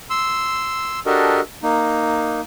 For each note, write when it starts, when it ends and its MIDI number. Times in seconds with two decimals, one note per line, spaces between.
0.10 0.99 84
0.10 0.99 88
1.06 1.40 62
1.06 1.40 66
1.06 1.40 67
1.06 1.40 69
1.06 1.40 70
1.06 1.40 75
1.63 2.41 58
1.63 2.41 63